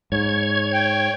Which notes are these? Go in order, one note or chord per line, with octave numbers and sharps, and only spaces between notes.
G#2 C#5 G#6
G5